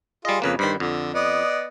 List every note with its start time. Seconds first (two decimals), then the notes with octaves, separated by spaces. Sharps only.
0.25 G3 F4 G#4 D#5
0.42 F2 C#3 A#3 B4
0.59 G2 D#3 C5 B5
0.80 F2 D3
1.14 B3 D5 D#5